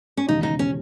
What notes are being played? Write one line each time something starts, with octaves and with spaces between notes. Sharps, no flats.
C#4
E1 D#2 C#3 D#4
D#4
C#4